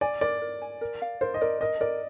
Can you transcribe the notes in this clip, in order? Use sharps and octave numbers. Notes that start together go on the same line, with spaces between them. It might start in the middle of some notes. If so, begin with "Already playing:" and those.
D5 G#5
A#4 D5
A#4
G#5
A#4
F5
A#4 C5
D#5
A#4 D5
A#4 D#5
A#4 D5